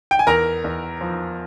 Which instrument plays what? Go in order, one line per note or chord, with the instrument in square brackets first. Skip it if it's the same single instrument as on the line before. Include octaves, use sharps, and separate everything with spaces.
[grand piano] G5
G#5
E2 A#4 A#5
E2
F3